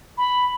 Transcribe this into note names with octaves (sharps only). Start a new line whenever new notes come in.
B5